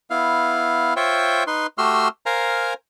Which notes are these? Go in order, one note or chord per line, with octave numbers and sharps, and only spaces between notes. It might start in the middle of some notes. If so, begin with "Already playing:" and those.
B3 E4 F5
F4 C5 C#5 E5 G5
D#4 B4 C6
A3 F#4 G4 C6 E6 F6
A#4 C5 F5 G#5 A#5